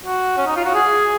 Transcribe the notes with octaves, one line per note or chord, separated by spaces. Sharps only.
F#4
C#4
D#4
F4
F#4
G#4